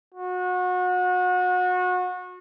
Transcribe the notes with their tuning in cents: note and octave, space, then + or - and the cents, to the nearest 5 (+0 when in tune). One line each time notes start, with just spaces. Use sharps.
F#4 -30